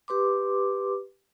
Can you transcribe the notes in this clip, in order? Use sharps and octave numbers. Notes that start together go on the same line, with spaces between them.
G4 B4 C6 D6